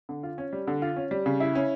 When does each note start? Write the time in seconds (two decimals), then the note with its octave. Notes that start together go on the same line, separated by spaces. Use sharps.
0.09 D3
0.23 F4
0.38 C#4
0.53 G3
0.67 D3
0.82 F4
0.96 C#4
1.11 G3
1.26 C#3
1.40 E4
1.55 C#4